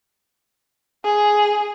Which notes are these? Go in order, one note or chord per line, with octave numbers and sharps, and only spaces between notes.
G#4